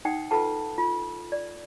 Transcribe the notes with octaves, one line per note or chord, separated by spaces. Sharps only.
D#4 F#5 G5 D#6
F4 A4 B4 F#5 A5
F4
D5